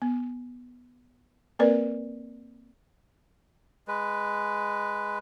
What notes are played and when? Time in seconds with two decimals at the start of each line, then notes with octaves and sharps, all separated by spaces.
0.02 B3
1.59 A#3 C4 A#4 B4 D5
3.88 G#3 B4